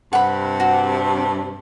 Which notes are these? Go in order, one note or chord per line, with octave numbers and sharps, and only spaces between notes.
G2 C3 F#5 B5
F#4